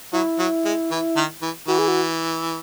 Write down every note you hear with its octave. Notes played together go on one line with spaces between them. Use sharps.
F#3 E4
F#3
G#3
E3
D#3
E3
E3 F#4
G#4
F#4